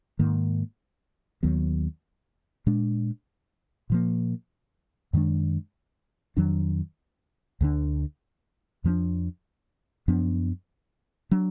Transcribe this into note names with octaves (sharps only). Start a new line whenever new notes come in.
G#2 D#3 A#3
D#2 D#3 F#3 B3
A#2 G#3 D4
A#2 F3 A#3
F#2 D#3 G#3 D4
F2 D#3 F#3 D4
D2 D3 F#3 D4
F2 F3 A#3 D4
F#2 F3 B3 D4
F#3 D4